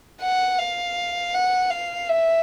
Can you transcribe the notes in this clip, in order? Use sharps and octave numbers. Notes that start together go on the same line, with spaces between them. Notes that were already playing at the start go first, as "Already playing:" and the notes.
F#5
F5
F#5
F5
E5